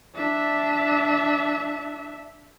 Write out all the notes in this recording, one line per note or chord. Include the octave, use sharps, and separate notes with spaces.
D4 E5